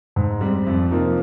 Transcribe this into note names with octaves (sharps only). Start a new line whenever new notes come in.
G#2
G3 C4
F2
C3 F3 A#3 D#4